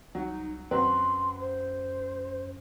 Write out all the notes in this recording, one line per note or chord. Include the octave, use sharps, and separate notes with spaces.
C2 F#3 D#4
F#2 F#3 C4 B4 C6
C5